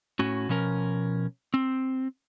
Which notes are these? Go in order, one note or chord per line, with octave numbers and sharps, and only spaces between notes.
A2 C#4 F#4
B2 F3 C#4 A#4
C4